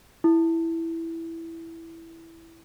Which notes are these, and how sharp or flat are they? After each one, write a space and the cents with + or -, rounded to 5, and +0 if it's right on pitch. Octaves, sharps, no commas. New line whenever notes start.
E4 +0